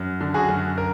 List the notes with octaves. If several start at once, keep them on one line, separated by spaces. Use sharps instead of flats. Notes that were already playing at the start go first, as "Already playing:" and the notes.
Already playing: F#2
D3
F#4 G#4
F#2
A#4